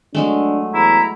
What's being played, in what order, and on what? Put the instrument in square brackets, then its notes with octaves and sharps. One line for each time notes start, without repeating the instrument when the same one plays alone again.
[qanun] F#3 G#3 A3 [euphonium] D4
[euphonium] E2 [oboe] E4 [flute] A#5